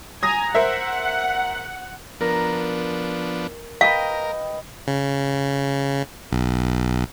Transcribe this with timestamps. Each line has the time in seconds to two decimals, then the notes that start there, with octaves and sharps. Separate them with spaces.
0.23 G#5 A#5 D#6 A#6
0.55 A#4 C5 E5 F#5
2.21 F3 B3 D4 A#4
3.81 A#4 B4 D#5 F5 G5
4.88 C#3
6.32 B1